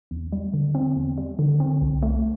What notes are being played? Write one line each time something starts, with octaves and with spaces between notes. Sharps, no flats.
E2
G3
D3
C4
E2
G3
D3
C4
C2
A3